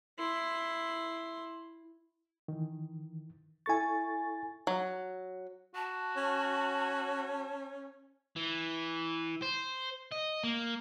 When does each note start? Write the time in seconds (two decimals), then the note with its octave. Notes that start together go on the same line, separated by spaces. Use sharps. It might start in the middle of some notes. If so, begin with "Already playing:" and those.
0.19 E4 C6
2.48 D#3 E3
3.66 E4 A4 G#5 C#6 A6
4.67 F#3
5.75 F#4 A5
6.16 C#4
8.36 E3
9.42 C5
10.11 D#5
10.43 A#3